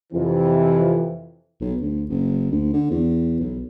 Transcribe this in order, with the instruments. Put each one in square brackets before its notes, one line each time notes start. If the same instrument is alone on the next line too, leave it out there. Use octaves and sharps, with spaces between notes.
[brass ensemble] F2 C3 E3
[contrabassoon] B1
D2
F#1
D2
D3
E2
B1